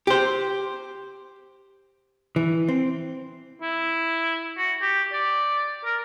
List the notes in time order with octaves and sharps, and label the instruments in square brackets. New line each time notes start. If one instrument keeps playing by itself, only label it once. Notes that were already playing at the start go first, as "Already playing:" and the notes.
[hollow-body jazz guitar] G4 C5
E3
C4
[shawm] E4
F#4
G4
D5
A#4